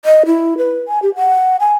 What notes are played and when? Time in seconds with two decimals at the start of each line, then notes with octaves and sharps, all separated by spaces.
0.05 D#5
0.26 E4
0.58 B4
0.88 G#5
1.02 G4
1.16 F#5
1.60 G#5